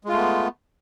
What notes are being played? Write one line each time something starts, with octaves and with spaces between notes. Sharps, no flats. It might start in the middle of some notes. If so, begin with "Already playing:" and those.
G#3 A3 B3 F4